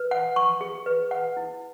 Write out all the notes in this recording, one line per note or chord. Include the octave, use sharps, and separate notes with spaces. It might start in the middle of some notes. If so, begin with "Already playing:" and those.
Already playing: B4
F#5
C#6
G#4
B4
F#5
E4